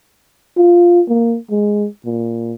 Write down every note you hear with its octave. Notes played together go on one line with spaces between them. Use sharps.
F4
A#3
G#3
A#2